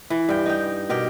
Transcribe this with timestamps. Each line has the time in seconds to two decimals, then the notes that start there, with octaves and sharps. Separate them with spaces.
0.10 E3
0.29 G2 G5
0.46 D#4 G5
0.89 B2 G4 A#4 G5